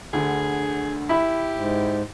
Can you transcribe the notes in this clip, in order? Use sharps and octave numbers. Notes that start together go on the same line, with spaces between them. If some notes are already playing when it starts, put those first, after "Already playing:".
D2 D3 G#4
E4 G4 B5
G#2